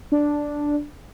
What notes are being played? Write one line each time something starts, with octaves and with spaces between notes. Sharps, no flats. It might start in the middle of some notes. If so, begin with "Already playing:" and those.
D4